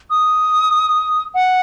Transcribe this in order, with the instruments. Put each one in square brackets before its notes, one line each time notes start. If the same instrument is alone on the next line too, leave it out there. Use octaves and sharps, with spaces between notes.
[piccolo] D#6
F#5